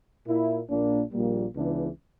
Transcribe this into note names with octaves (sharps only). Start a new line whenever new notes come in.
A#2 A#3 E4
A#1 A#2 A#3 D4
A#1 A#2 G3 A#3
C#2 C#3 E3 B3 D4